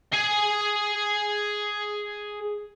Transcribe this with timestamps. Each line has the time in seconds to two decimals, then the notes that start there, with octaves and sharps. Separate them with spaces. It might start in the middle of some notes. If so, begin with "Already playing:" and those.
0.13 G#4 G#5